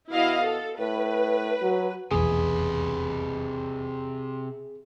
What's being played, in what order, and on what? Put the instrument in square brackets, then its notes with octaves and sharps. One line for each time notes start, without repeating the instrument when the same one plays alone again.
[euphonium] B2 [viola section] E4 D#5 F5
[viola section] A4
[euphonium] A2 [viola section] B4
[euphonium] F#3
[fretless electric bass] F1 B1 E2 [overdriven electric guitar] C3 B4 [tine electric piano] G#4